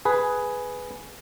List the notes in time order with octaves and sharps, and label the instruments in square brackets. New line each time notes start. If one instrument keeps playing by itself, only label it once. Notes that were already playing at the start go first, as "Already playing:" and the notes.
[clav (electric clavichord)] G#4 B4